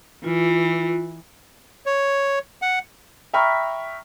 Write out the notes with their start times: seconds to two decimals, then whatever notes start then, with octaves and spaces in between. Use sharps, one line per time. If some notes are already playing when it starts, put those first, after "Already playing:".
0.24 E3 F4
1.86 C#5
2.62 F#5
3.33 E5 G5 A#5 B5 C#6 F6